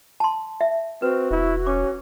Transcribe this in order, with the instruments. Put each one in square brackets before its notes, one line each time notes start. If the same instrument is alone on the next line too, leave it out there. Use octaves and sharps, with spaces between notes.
[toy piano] A5 C6
E5
[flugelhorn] C4 [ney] F#4 [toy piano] B4
[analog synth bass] E1 [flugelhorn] E4
[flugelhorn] C#4 [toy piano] D6